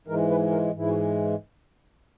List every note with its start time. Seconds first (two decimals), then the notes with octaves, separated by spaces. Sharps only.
0.08 G#2 E3 G#3 A#4
0.29 B4
0.51 A#4
0.73 G#2 E3 G#3 E4
0.89 F#4